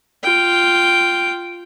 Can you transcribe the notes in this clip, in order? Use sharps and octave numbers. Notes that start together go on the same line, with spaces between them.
F4 G5